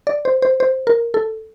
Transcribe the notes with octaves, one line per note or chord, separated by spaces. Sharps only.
D5
C5
C5
C5
A#4
A4